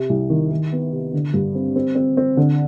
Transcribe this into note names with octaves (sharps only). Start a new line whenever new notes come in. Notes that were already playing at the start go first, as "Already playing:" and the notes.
Already playing: C3
C2
D#3
D#3
B3
C3
D3
G2
C4
C4
C4
C4
D3